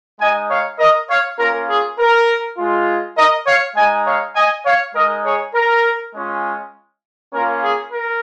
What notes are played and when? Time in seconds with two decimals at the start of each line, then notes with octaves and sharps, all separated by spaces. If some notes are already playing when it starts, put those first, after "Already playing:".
0.19 G#3 D#4 D#5 G#5
0.49 C#5 F5
0.79 A#4 D#5
1.09 C#5 F5
1.38 A#3 C#4 F4 A#4
1.68 G#4
1.98 A#4
2.57 G#3 F4
3.17 A#4 D#5
3.46 C#5 F5
3.75 G#3 D#4 D#5 G#5
4.05 C#5 F5
4.35 D#5 G#5
4.65 C#5 F5
4.94 G#3 D#4 A#4 D#5
5.24 G#4 C#5
5.54 A#4
6.13 G#3 C#4 F4
7.33 A#3 C#4 F4 A#4
7.62 G#4
7.91 A#4